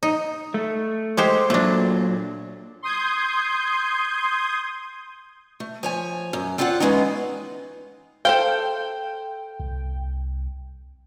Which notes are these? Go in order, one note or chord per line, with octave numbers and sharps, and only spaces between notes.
D#4
A3
G#3 G4 C5
A#2 F#3 A3 D4
C6 D#6 G6 G#6
A3
F3 C#5 G#5
F#2
C4 F4 A4 D5 E5 F#5
E3 F3 G#3 B3 C#4 D#4
A4 C5 F5 G5
C2